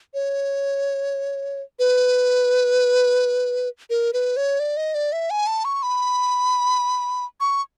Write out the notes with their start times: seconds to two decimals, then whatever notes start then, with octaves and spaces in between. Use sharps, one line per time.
0.14 C#5
1.79 B4
3.90 A#4
4.13 B4
4.37 C#5
4.60 D5
4.77 D#5
4.95 D5
5.12 E5
5.30 G#5
5.47 A5
5.65 C#6
5.83 B5
7.40 C#6